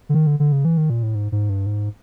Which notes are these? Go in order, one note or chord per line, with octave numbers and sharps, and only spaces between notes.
D3
D#3
D3
D3
C#3
E3
D#3
A#2
A2
G#2
G#2
G2
G#2